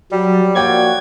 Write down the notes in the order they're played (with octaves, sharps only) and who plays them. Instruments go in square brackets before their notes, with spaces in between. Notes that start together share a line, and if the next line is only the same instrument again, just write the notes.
[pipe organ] F#3 [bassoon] G3
[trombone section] F3 A#3 F#4 [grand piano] C#5 D5 G5 [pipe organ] G#6